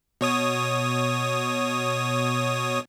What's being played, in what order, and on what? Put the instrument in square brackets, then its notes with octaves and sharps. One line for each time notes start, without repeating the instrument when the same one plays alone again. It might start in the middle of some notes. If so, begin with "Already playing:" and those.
[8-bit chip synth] B2 C#5 D#6